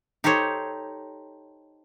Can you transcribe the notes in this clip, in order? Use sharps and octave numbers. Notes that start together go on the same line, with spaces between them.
D#4 G4 A4 C5 C#5